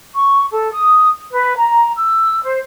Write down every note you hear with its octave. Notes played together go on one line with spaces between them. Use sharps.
C#6
A4
D#6
B4
A#5
E6
C5